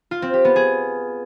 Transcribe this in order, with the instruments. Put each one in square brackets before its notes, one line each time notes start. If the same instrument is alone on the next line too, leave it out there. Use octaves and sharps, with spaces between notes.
[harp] F4
C4
G4
B3
G#4